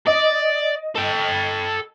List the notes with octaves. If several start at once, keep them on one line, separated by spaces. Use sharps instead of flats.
D5 D#5
A4 G5